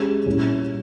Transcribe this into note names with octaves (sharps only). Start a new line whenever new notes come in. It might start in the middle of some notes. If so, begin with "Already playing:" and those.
Already playing: G#3 C#4 G4
A#2 G3 C#4 E4